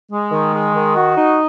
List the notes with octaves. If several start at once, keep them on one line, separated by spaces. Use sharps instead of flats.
G#3
D#3
G#3
D#3
F#4
D#4